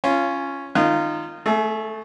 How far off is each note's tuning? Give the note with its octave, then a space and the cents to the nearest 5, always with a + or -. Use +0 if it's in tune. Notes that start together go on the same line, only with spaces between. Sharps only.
C#4 +0 F4 -20
D#3 -25 F4 -20
A3 +0 G#4 +40